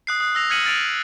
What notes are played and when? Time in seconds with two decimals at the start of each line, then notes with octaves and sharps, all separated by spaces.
0.07 D#6 F#6 C7
0.20 D#6 F#6
0.35 E6 A#6 F7
0.50 F6 G#6 B6 C#7 D#7 F#7
0.65 F6 A6 D7 F7